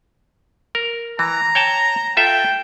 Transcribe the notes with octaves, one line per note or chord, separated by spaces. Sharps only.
A#4
E3 A#5
C#5 G5 A5
F4 A4 E5 G5